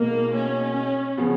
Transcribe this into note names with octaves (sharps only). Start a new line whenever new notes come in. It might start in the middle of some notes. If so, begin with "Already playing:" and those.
Already playing: B2 G#3 A#3 D#4 F#4
C#4
C#3 F3 B3